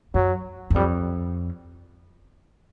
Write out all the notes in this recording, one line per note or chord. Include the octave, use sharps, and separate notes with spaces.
F#2 F#3
F#2
F2 G3